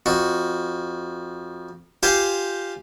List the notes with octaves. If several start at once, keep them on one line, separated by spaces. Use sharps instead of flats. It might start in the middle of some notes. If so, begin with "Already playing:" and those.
F2 F#4
F4 G4 C5 G#5 C6